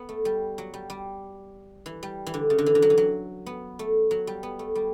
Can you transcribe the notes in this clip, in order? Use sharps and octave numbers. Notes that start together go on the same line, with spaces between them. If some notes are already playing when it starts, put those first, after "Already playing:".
Already playing: B3
A3
G3
F#3
G3
G3
E3
G3
E3
D3
C#3
D3
E3
D3
F#3
E3
F#3
B3
A3
F#3
G3
B3
A3
G3